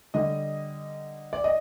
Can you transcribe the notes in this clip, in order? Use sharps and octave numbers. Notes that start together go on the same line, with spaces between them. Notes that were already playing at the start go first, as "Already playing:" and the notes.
D3 G3 D#5
D5
D#5